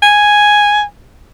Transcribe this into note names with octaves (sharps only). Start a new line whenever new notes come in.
G#5